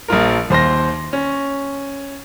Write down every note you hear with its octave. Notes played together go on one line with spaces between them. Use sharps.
A#1 F3 F4 A#4
D#2 C5 C6 A#6
C#4